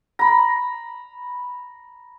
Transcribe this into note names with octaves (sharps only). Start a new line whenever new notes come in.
A#5 B5